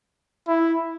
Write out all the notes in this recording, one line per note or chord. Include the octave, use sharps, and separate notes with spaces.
E4